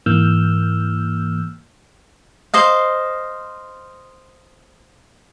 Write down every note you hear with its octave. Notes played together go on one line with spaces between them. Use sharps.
G#2 E3 A#3 E6 F6 G6
C5 D#5 F5